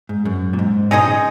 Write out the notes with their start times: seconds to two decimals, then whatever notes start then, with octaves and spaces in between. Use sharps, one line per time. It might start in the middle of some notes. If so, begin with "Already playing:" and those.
0.09 G#2
0.25 F#2
0.53 A#2
0.59 G#2
0.91 B2 G#3 D#4 G#4 D#5
1.02 B2
1.08 C#3